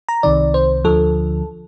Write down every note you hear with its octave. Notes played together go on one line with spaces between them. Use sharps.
A#5
C2 C3 D#3 D5
C5
D2 D3 F3 A4